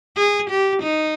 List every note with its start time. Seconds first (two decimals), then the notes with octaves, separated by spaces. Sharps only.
0.17 G#4
0.50 G4
0.83 D#4